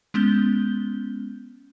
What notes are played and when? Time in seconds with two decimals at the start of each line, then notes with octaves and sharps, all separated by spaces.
0.14 G#3 B3 C#4 G6 G7